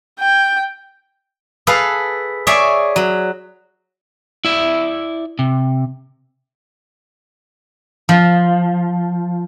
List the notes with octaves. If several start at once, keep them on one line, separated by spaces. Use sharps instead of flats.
G5
G#4 A4 B4 F5
G#4 C#5 D5 E5 G#5
F#3
E4 D5 E5
C3
F3